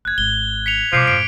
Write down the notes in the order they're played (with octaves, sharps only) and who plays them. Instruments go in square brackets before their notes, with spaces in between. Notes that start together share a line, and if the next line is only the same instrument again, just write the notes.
[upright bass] F#1 [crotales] F#6 G#6
[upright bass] G#1 [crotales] G7
[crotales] B6 C#7 F7
[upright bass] B2 G3 [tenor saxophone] F3 [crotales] D6 B6 C7
[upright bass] F#2 A2 [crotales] D7